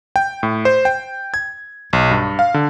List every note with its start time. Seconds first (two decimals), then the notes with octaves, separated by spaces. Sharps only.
0.16 G5
0.43 A2
0.65 C5
0.85 G5
1.34 G#6
1.93 B1
2.11 G2
2.39 F5
2.54 D3